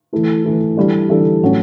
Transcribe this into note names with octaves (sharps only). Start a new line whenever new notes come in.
E3 A3 E4
E3 A3 E4
E3 G3 D4 A4
E3 G3 D4 A4
A2 F#3 C#4